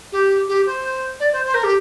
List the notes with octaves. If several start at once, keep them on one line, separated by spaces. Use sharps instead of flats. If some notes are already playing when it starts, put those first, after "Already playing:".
G4
G4
C5
D5
C5
C5
A#4
G4